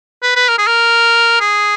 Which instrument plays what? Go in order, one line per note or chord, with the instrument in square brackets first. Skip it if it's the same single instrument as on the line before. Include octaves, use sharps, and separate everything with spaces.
[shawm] B4
B4
A#4
G#4
A#4
G#4